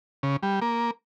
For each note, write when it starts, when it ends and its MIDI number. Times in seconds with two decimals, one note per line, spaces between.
0.23 0.36 49
0.43 0.60 55
0.62 0.91 58